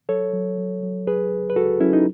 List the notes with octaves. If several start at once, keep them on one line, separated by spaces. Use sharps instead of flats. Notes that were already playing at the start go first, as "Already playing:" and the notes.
F#3 A4 C#5
F#3
F#3
F#3
C#2 G#4 B4
C#2
B4
C#2 F#4 A4
F#3 C#4 E4
D#4